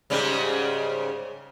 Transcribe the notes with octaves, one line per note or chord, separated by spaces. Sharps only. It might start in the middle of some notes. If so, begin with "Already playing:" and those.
G#2 C#3 G3